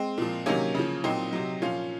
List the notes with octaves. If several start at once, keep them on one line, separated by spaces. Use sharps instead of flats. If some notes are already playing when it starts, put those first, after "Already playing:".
Already playing: G#3 C4
A#2 F3
C3 D#3 F#3 A#3 C#4
C#3 F3
A#2 F#3 C4 D#4
C3 F#3
A#2 F3 C#4 F4